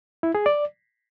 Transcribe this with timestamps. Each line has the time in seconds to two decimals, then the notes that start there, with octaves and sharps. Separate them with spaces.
0.23 E4
0.35 G#4
0.46 D5